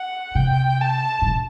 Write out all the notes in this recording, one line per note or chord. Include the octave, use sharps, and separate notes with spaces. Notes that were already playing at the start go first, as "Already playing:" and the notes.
Already playing: F#5
C3 G5
A5
A2
B2